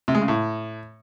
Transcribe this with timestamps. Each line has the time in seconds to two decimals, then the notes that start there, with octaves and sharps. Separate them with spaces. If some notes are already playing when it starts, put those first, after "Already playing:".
0.08 C3
0.15 G#3
0.21 C#3
0.28 A2